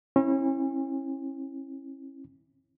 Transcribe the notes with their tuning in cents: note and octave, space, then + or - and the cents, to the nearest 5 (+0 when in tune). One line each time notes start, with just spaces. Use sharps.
C#4 -40 E4 -10